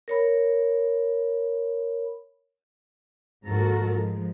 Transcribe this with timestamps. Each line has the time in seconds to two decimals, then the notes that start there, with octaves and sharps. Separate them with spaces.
0.08 A#4 C#5 B5
3.46 D#2 G#2 F3 F#4 A4 A#4
3.93 F3 G#3